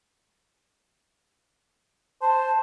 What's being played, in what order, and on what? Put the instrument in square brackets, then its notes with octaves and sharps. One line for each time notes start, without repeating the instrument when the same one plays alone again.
[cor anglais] C5 [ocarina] A5